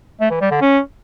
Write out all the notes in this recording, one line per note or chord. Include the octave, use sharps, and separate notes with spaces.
A3
E3
G3
D3
C#4